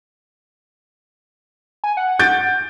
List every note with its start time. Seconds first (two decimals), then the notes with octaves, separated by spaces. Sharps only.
1.84 G#5
1.97 F#5
2.19 G6 A6 D7